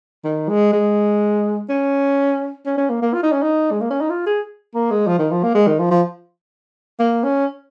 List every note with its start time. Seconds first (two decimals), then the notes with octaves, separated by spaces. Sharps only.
0.24 D#3
0.48 G#3
0.73 G#3
1.69 C#4
2.66 C#4
2.77 C#4
2.90 A#3
3.02 A#3
3.14 F4
3.23 D#4
3.32 C#4
3.42 D#4
3.71 G#3
3.81 A#3
3.90 C#4
4.01 D#4
4.10 F4
4.26 G#4
4.74 A#3
4.91 G#3
5.07 F3
5.18 D#3
5.31 F3
5.43 A#3
5.55 G#3
5.67 D#3
5.79 F3
5.91 F3
6.99 A#3
7.24 C#4